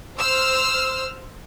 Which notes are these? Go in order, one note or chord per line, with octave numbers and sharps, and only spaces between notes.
C5 E6 F6